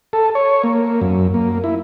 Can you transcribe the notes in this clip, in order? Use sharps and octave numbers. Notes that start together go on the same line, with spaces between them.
A4
C#5
A#3
F#2
A#3
E4